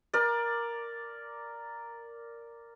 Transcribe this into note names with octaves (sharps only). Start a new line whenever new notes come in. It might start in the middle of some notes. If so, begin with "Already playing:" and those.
A#4 D5